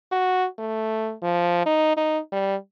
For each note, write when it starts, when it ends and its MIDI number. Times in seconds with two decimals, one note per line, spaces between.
0.12 0.46 66
0.59 1.13 57
1.23 1.64 53
1.66 1.93 63
1.97 2.19 63
2.32 2.56 55